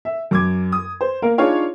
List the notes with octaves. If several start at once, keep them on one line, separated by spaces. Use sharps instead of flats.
E5
F#2 D6 G#6
D#6
C5
A#3 A#4 F5
D4 D#4 F4 G#4 C#5 F5